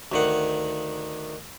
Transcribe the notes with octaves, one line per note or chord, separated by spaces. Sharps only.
D2 D#3 F#5